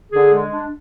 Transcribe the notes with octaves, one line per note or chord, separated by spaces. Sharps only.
D3 G#4
G#3
D4